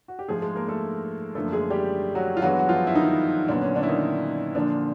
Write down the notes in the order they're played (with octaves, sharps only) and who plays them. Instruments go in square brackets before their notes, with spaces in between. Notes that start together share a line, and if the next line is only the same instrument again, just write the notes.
[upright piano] F#4
G4
G#2 F3 G#3 A3 G#4
G#3 G#4
A#3 A#4
A3 A4
F#2 D3 F3 A3 A#3 A4
G#3 G#4
G3 G4
F#3 F#4
F4
G2 E3 F#3 G#3 B3 F#4
F#4
F3 F4
E4
D#3 D#4
A#2 D3 F#3 B3 D4
C#4
D3 D4
E4
D#3 D#4
A#2 D3 F3 A#3 D4